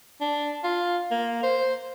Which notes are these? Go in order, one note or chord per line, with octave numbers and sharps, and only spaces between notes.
D4
F4
A#3
C5